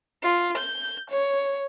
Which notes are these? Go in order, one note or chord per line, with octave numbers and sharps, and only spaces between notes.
F4
G6
C#5